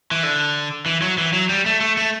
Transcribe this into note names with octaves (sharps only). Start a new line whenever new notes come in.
E3
D3
E3
F#3
E3
F#3
G3
A3
A3
A3